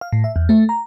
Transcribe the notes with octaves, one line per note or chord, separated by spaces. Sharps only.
F5
A2
E5
E2
A3
A#5